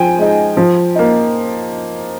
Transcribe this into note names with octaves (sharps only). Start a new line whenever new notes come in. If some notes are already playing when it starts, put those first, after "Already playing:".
Already playing: F3 G5 G#5
G#3 D#4
F3
A#3 D#4